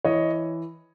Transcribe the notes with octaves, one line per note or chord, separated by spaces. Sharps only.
E3 C#5 D#5